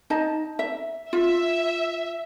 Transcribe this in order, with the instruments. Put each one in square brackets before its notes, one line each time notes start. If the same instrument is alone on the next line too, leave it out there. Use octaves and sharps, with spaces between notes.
[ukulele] D#4 D#5 A5
E5
[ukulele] F4 [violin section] E5